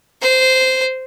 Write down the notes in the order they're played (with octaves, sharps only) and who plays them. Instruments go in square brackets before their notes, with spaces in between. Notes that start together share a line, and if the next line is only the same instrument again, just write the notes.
[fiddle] C5